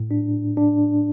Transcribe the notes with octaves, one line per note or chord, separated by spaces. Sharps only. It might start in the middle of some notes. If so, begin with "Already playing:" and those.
Already playing: A2
D4
D4